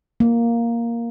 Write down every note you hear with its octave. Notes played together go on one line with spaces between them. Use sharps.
A#3